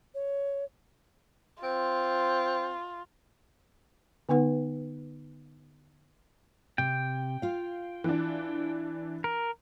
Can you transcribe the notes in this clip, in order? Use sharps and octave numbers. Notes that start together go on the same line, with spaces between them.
C#5
C4 F4
D3 B3 D#4 B4 F#5
C3 G5
F4 F5
E3 D4
A#4